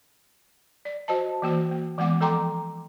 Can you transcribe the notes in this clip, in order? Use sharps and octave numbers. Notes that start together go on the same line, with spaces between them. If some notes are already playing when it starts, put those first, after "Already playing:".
D5
F#4 C5 D#5 A5
E3 A#3 F#4 C5
A#3
E3 G#3 B3 F#5 D6
F3 A4 G5 A#5 C6 D6